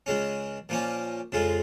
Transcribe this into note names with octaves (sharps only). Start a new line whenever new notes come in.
C#2 C#3 G#3 C#4
A#2 F3 A#3 C#4
F2 C#3 G#3 F4